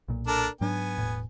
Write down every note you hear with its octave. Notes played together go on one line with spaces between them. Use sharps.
B1 A#2
D4 A4 A#4
G#2 F#3 B3 D4 G#5
E1 A2